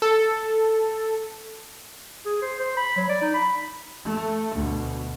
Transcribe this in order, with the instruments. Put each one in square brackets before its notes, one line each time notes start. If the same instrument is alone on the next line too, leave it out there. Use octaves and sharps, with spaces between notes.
[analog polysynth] A4
[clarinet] G#4
C5
C5
B5
F#3
D5
D#4
B5
[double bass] A3
D2 B2